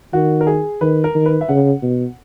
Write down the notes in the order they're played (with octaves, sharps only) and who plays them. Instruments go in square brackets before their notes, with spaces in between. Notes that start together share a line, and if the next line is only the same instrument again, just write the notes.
[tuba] D#3 [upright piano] F#4
[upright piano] A#4
G#4
[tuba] D#3 [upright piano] B4
[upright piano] A#4
[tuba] D#3
[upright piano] B4
E5
[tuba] C#3 [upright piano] F#5
[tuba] B2